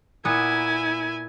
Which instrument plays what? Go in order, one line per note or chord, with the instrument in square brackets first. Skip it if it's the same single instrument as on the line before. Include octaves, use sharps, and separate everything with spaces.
[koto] A#2 B3 [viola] E4 G#5